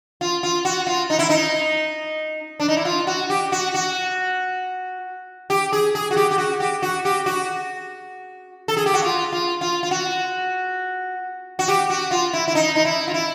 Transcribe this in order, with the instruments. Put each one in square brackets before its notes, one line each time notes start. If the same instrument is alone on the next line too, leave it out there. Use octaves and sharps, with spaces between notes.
[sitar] F4
F4
F#4
F4
D#4
E4
D#4
D4
D#4
E4
F4
F#4
G4
F#4
F#4
G4
G#4
G#4
F#4
G4
G4
F#4
G4
F#4
G4
F#4
A4
G#4
G4
F#4
F4
F4
F4
F4
F#4
F#4
G4
F#4
F4
E4
E4
D#4
D#4
E4
F4
E4